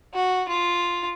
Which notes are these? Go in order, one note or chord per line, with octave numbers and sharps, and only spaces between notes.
F#4
F4